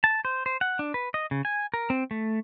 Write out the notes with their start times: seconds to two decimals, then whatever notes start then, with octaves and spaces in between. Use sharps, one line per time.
0.04 A5
0.25 C5
0.46 C5
0.61 F#5
0.79 D4
0.94 B4
1.14 D#5
1.31 C#3
1.45 G#5
1.74 A#4
1.90 C4
2.11 A3